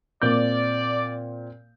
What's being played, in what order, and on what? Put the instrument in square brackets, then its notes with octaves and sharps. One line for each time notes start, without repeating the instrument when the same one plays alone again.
[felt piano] A#2 C4 G6 [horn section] D5